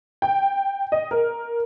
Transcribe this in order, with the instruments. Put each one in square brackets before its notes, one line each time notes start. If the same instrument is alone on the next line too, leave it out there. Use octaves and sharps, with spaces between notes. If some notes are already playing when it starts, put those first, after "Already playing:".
[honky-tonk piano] G5
D#5
A#4